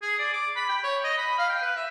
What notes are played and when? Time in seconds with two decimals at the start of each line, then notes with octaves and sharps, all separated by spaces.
0.02 G#4
0.19 D5
0.33 D6
0.56 B5
0.69 G5
0.84 C#5
1.04 D#5
1.18 B5
1.38 F5
1.50 G5
1.62 B4
1.76 E5